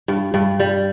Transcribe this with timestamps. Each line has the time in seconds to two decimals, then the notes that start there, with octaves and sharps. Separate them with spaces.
0.08 G2
0.34 G2
0.60 G3